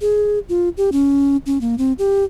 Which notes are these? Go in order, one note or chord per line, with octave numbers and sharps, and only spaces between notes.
G#4
F4
G4
C#4
C#4
A#3
C4
G4